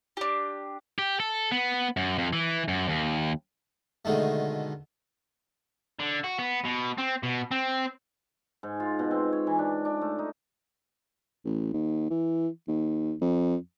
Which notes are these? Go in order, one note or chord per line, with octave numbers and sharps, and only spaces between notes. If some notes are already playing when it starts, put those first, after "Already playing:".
D4 G4
G4
A4
B3
F#2
F2
E3
F#2
D#2
B2 D3 D#3 G#3 A3
D3
F#4
B3
B2
C4
B2
C4
G#2
F4
B2
C4
C#5
E3
D4
D4
A3
D#4
A1
D#2
E3
D#2
F2